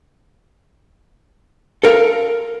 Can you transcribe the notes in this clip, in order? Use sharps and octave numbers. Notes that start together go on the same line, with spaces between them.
A4 A#4 F5 A#5